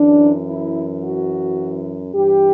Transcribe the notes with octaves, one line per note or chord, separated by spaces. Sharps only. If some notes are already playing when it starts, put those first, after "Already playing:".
Already playing: F#2 E3 D4
E4
F#4
G2 E3 G4